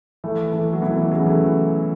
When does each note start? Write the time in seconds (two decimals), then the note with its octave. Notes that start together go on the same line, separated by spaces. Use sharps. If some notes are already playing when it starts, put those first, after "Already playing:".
0.24 E3 A3
0.53 E3 A3
0.73 F#3
0.82 B2 E3
0.97 B2 E3
1.11 C#3 F#3
1.26 E3 A3